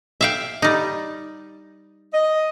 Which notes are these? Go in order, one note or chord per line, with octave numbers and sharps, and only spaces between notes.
E5 F5 G5
G3 D#4
D#5